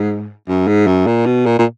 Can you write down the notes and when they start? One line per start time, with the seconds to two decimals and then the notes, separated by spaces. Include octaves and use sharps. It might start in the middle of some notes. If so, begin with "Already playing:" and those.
Already playing: G#2
0.48 F#2
0.67 G#2
0.87 F#2
1.07 A#2
1.26 B2
1.46 A#2
1.59 A#2